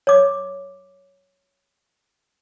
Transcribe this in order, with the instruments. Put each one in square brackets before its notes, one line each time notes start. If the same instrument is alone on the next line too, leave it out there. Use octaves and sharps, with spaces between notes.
[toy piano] C#5 D6